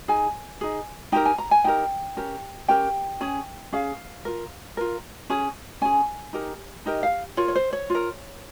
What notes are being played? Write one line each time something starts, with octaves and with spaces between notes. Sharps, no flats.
D#4 G#4 G#5
D#4 G#4
D#4 G4 A#4 G5
G#5
A#5
G#5
D#4 G4 A#4 G5
C#4 G4 A#4
C#4 G4 A#4 G5
C#4 G#4
C#4 G#4 F5
F4 A#4
F4 A#4
C#4 G#4
C#4 G#4 G#5
D#4 G4 A#4
D#4 G4 A#4 D#5
F5
F4 A#4 C#5
C#5
C5
C#5
F4 A#4